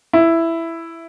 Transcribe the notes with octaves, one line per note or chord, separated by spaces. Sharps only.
E4